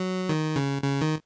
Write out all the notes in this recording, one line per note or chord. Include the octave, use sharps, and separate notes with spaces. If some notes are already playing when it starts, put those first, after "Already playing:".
Already playing: F#3
D#3
C#3
C#3
D#3